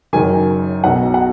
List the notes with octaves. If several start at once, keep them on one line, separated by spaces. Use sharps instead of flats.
F#1 F#2 D#3 G#5
B1 B2 F#5
F#5